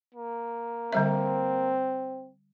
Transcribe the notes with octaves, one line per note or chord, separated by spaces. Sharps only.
A#3
D3 G3 C4 E5